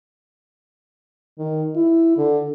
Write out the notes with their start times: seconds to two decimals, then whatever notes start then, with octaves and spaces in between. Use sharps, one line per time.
1.38 D#3
1.76 E4
2.18 D3